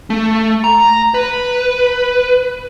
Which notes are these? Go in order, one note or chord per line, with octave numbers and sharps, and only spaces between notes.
A3
A#5
B4